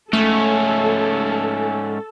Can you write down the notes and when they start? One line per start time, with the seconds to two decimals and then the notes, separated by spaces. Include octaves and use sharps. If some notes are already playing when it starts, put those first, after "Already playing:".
0.13 G#2 A3 C#4 A4